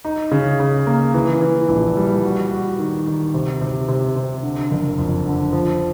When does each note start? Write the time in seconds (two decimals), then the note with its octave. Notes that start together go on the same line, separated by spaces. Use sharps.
0.05 D#4
0.31 C#3
0.60 C#3
0.87 A#3
1.14 E3
1.41 E3
1.68 A#1
1.97 G3
2.24 F#4
2.51 F#4
2.79 D#3
3.06 D#3
3.34 C3
3.61 C3
3.88 C3
4.16 C3
4.43 D3
4.71 F#1
4.98 F2
5.26 D3
5.53 F3